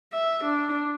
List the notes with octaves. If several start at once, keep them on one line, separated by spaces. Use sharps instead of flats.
E5
D4